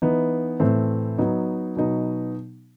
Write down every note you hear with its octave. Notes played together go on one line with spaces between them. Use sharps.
E3 B3 D#4
A2 E3 A3 C4
F#3 B3 D#4
B2 F#3 B3 D#4